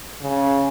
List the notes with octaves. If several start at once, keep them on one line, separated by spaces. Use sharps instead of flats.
C#3